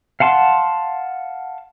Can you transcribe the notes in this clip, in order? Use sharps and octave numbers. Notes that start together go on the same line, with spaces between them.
F5 F#5 A5 C6